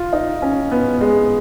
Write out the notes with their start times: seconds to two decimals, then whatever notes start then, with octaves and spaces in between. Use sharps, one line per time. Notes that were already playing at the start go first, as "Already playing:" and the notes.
Already playing: F4
0.13 D#4
0.42 C#4
0.71 B3
1.01 G#3